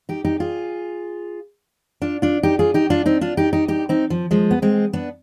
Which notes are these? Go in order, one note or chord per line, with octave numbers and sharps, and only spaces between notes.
D#4 G4
D#4 G4
F4 G#4
D4 F4
D4 F4
D#4 G4
F4 G#4
D#4 G4
D4 F4
C4 D#4
D4 F4
D#4 G4
D#4 G4
D#4 G4
C4 D#4
F3
F3 G#3
B3
G#3 C4
B3 D4